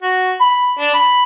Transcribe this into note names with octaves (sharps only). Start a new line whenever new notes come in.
F#4
B5
D4
B5